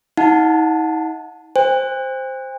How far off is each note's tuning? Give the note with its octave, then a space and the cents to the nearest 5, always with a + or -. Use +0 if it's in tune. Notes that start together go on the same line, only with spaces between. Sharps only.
D#4 +45 F#5 -25 A5 +0
C5 +0 G5 +45